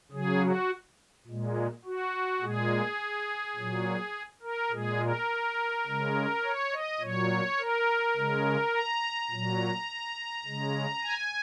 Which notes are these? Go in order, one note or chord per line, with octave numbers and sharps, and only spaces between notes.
C#3 F#3 G#4
F#4
A#2 G#3
F#4
A#2 G#3 G#4
A#2 F#3
A#4
A#2 G#3 G#4
A#4
C#3 G#3
C#5
D#5
A#2 F#3 C#5
A#4
C#3 G#3
A#5
A#2 F#3
C#3 G#3
G#5